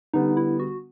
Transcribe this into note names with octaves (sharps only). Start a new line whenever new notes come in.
D3 G3 B3 D#4
E4
F#4